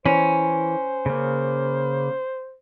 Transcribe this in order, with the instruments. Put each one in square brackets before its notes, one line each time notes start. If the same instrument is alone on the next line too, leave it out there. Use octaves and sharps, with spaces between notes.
[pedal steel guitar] E3 [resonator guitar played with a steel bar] C#4 [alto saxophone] C5
[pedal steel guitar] C#3 A#3